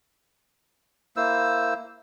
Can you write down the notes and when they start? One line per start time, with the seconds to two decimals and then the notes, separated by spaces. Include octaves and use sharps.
1.16 A#3 E4 C5 E6